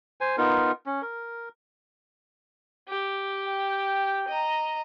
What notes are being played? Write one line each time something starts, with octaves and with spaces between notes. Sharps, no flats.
C5 G#5
B3 D#4 F4 A#4
C#4
A#4
G4
G5
D#5 A#5